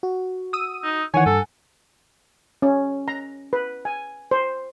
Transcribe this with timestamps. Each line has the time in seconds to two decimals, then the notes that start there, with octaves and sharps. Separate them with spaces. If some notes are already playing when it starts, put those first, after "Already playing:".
0.03 F#4
0.53 D#6 E6 D#7
0.84 D#4
1.14 D#3 E3 C#5 F#5 G#5
1.26 G2 A4
2.62 C#4
3.08 A#5
3.53 B4
3.85 G#5
4.31 C5